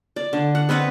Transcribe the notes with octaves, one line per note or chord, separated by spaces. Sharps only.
D5
D3
F#5
B3 C4 B4 F#5